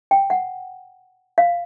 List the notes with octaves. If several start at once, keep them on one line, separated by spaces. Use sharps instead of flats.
G5
F#5
F5